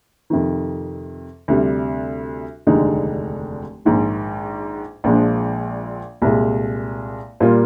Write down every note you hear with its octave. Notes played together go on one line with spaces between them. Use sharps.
F2 C3 D#3
D2 C3 G3
F1 D#2 D3 G#3 D#4
A#1 G#2 D#3
A#1 A#2 F3 G#3 D4
C2 A#2 G#3
A#2 G3 A#3 F4